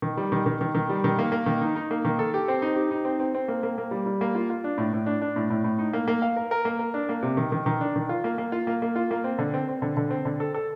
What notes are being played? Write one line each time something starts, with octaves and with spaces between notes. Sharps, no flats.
D#3
G3
D#3
D#3
D#3
D#3
G3
D#3
A#3
A#3
D#3
D#4
D#4
A#3
D#3
A4
G4
C4
D#4
G4
D#4
C4
C4
C4
A#3
A#3
A#3
G3
G3
A#3
F4
F4
D4
A2
A2
D4
D4
A2
A2
A2
D#4
A#3
A#3
F5
A#4
A#4
A#3
A#4
D4
A#3
C3
D#3
D#3
D#3
D4
D#3
F4
A#3
A#3
F4
A#3
A#3
F4
A#3
C4
D3
C4
C4
D3
D3
C4
D3
A4
A4